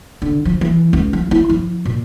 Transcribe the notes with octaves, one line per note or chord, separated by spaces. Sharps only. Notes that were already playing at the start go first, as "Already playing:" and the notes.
D3
F3
E3
C#2
F3
E4
F3
A#2